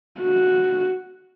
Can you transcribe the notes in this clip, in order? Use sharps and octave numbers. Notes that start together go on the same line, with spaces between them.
F#4